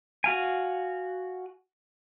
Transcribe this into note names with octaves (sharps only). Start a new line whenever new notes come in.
F#4 F5 G#5